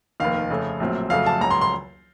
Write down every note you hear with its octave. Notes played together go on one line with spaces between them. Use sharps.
F1 D#2 D#3 F5
F2 C#3 A3
A#1 A2 F#3 C4
F2 C#3 F#3 A3 F5
A5
C#2 C#3 F#3 A#5
C6
C6